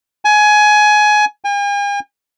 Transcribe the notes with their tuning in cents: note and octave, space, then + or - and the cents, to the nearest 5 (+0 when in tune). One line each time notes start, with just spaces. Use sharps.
G#5 +20
G#5 -45